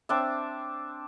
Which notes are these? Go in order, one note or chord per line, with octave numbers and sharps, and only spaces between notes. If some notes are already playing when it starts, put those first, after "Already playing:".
C4 D4 D5 E5